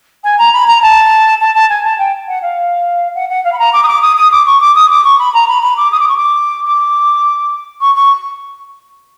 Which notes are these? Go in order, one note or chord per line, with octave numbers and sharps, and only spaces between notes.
G#5
A#5
B5
A#5
A5
A5
A5
G#5
A5
G5
F#5
F5
F#5
F#5
F5
B5
A#5
D6
D#6
D6
D#6
D#6
D6
C#6
D6
D#6
D6
C#6
B5
A#5
B5
B5
D6
D#6
D6
C#6
D6
D6
C#6
C#6